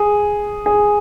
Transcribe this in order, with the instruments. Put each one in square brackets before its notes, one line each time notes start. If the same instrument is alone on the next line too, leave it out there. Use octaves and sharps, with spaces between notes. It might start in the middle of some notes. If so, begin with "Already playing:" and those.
Already playing: [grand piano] G#4
G#4